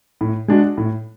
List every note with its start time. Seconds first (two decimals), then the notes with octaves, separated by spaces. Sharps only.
0.21 A2
0.48 G#3 D4 F#4
0.78 A2